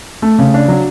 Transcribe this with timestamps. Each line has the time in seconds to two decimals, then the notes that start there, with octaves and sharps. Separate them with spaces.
0.22 A3
0.38 C#3
0.54 D4
0.68 F#3